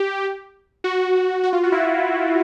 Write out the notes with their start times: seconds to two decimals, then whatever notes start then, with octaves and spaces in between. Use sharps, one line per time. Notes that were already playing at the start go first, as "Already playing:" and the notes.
Already playing: G4
0.84 F#4
1.44 F#4
1.53 F4
1.63 F#4
1.72 E4